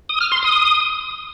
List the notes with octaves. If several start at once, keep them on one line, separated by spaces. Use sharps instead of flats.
D#6
F6
C6
D#6